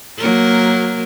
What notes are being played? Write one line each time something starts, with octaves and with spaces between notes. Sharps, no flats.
F#3 A#3 A#4